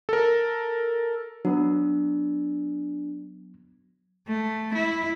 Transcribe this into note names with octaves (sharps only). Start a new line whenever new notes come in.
A4 A#4
F#3 B3 D4
A3
E4